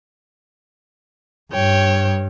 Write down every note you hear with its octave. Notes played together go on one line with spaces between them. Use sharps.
G2 C#5 G5